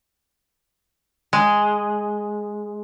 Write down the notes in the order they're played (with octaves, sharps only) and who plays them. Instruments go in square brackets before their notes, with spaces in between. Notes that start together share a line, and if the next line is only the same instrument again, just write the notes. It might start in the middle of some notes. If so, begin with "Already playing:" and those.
[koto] G#3